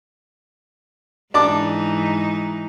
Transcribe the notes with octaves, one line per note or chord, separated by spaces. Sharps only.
G#2 E3 D4 D#4 A5 D6